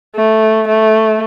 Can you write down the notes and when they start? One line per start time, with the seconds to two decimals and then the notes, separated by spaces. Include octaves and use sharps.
0.16 A3
0.68 A3